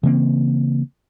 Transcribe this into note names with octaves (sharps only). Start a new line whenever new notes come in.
C#3 E3 A#3 C4